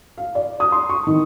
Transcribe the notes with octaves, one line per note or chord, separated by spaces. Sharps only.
F5
D5
D#6
C6
C#6
D#3